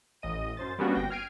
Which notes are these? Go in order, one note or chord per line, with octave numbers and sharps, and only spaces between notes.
A1 D#5 D#7
F#2 C5 A6
G3 A#3 B3 C#4 D4 F#4
G1 G5 A#6
F6 G#6 C7 D7 D#7